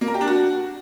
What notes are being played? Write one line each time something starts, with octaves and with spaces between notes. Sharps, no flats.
A#3
A#4
G4
D4
F#4